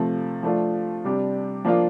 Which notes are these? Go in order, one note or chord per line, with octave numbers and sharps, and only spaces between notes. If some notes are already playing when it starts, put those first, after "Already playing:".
Already playing: C3 F3 A3
F3 A3 D4 F4
C3 G3 D4 G4
F3 A#3 D4 F4